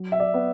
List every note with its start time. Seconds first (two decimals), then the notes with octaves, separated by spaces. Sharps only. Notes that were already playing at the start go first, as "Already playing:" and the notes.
Already playing: F#3
0.12 E5
0.20 D5
0.34 B3